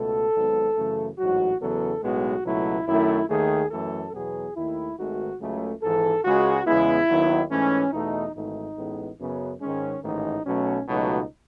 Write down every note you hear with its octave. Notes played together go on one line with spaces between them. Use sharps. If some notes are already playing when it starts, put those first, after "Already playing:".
Already playing: C#2 B2 A3 A4
G#1 G#2 F#3 B3
F#2 C#3 E3 A3
A1 G#2 F#3 F#4
E2 C#3 F#3 B3 A4
B1 A2 G#3 B3 F#4
C#2 B2 F#3 A3 E4
F#2 D#3 A3 E4
D#2 D#3 A3 G#4
F#2 E3 A3 A4
E2 B2 F#3 B3 G#4
D#2 D#3 A3 E4
G#1 G#2 D#3 A3 F#4
C#2 C#3 F#3 A3
G#1 G#2 E3 A4
C#2 C#3 G#3 F#4
E2 C#3 G#3 B3 E4
D#2 D#3 F#3 B3
G#2 E3 A3 C#4
E2 B2 A3 D#4
G#1 G#2 E3 A3 D#4
A1 A2 G#3 B3
F#2 C#3 F#3 B3
G#2 D#3 G#3 C#4
A1 G#2 D#3 A3 D#4
B1 B2 F#3 A3 C#4
C#2 B2 F#3 A3 D#4